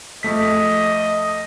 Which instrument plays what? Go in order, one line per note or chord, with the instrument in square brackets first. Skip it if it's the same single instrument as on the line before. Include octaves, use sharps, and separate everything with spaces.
[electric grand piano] F2 A3 B6 [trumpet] D#5